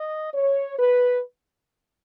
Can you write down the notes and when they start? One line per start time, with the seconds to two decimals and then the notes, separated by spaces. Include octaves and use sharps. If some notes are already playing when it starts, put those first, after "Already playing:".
Already playing: D#5
0.34 C#5
0.78 B4